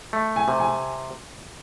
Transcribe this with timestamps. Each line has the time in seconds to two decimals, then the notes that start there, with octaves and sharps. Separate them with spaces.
0.13 A3
0.36 G#5
0.48 C3
0.60 G#5